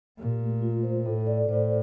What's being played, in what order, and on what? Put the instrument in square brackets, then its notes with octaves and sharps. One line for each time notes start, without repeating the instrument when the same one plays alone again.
[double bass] A#2 [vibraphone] G4
[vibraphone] A3
F4
C5
[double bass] A2 [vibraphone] A4
[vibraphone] D5
[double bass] A2 [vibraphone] C5